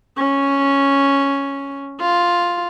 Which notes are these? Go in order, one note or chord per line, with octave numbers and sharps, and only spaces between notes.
C#4
F4